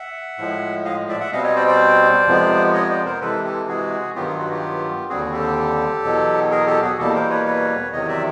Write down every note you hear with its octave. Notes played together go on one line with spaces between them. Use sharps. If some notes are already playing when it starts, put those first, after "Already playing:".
Already playing: E5 F#5
A2 F3 G#3
D#5 F5
D5 E5
E5 F#5
B2 G3 C4 D#5 F5
C#5 D#5
C5 D5
C5 D5
F2 C3 F3 G#3 B3
C#5 D#5
C5 D5
A#4 C5
C3 E3 G#3 A4 B4
G4 A4
F#4 G#4
G2 D#3 F#3 B3 F4 G4
F4
F#4
F4 G4
D#2 D3 G3 C4 F#4 G#4
G4 A4
E2 B2 F#3
G#4 A#4
G4 A4
F#4 G#4
E2 B2 G3 A#3 G4 A4
A#4 C5
B4 C#5
B4 C#5
E2 C3 D#3 F#3 C#5 D#5
D5 E5